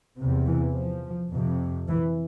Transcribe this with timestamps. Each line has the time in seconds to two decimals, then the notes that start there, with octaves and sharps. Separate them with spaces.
0.19 E2 C3
0.47 E3
0.76 F3
1.32 F2 C3
1.88 E3